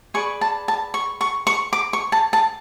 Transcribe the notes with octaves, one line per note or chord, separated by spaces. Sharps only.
G#4 B4 D5 C#6
A5
A5
C#6
C#6
C#6
D6
C#6
A5
A5